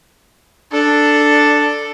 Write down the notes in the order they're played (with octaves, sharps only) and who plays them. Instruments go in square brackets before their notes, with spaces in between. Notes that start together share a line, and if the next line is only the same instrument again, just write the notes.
[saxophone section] D4 [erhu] A4